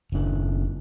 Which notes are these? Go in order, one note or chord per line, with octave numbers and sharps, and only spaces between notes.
F#1 D4